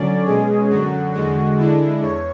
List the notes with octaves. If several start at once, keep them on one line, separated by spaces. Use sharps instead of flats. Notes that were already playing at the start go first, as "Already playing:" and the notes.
Already playing: D3 F#3 C#4 D5
B2 G#3 C#4 G#4
F#2 D3 F#3 F#4
E2 D3 G#3 F#4
D3 G#3 D4 E4
E2 C#5